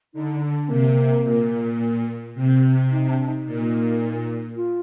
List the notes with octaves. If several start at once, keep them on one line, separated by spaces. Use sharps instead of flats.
D3 D#4
D4
C3 A#3
A#2
C3
D#4
D4
D#4
A#2
F4